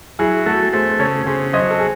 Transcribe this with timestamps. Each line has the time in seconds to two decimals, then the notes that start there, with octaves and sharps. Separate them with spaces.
0.19 F#3 E4 G#4
0.46 A3 F#4 A4
0.73 A3 G#4 C5
0.89 C5
0.99 C#3 A4 C#5
1.26 C#3 G#4 C5
1.53 F#3 C5 D#5
1.70 A4
1.80 G#4